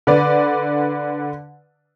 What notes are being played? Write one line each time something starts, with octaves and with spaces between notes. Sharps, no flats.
D3 B4 D5